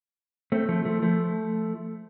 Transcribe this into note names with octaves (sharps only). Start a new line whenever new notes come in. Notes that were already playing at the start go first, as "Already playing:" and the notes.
A3 C4
F3 A3
F3 A3
F3 A3